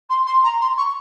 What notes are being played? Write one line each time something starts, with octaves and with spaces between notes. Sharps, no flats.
C6
C6
A#5
C6
C#6